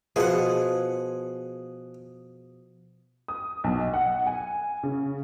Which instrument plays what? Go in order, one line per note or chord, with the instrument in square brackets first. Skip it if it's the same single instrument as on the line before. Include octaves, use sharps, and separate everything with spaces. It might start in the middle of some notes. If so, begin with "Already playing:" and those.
[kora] B2 F3 [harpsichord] G#4 F#5
[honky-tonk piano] D#6
B1
D#5
F#5
G#5
C#3